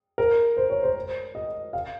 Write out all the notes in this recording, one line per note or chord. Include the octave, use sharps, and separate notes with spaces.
A#4
C5
C#5
C5
D#5
F5